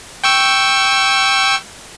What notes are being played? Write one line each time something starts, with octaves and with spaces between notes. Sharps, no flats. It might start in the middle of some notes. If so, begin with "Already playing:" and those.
G5 C#6 E6